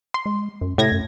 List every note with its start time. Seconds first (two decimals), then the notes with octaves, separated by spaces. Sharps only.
0.14 C6
0.26 G#3
0.61 F#2
0.78 A2 C3 G#6 A#6
0.92 F#2